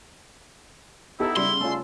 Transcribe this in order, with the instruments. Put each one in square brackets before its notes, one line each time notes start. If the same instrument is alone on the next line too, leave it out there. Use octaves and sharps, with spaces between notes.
[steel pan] B3 D#4 A4 [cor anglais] E4 [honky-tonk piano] G4
[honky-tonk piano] C#3 G3 [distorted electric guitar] C6
[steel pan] A3 C#4 F4 [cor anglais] A4